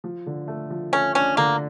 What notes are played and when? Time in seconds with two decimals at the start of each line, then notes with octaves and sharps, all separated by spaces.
0.04 F3
0.26 D3
0.48 A3
0.70 F3
0.92 A3 C#4
1.15 C#4 D4
1.37 D3 A#3